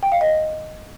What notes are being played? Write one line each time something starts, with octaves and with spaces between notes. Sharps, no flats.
G5
F5
D#5